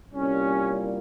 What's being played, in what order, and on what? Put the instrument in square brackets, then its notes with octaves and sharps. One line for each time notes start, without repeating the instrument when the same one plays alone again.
[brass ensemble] C2 A#2 G3 C#4